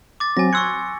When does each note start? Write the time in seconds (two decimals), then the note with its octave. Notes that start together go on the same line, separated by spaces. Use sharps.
0.20 D6 A6
0.37 F#3 C4 G#5 A#6
0.53 C6 C#6 E6 F#6 G#6 C#7